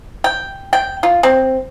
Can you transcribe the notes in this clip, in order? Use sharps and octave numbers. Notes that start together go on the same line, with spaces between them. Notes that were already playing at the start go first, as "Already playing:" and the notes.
G5
G5
F4
C4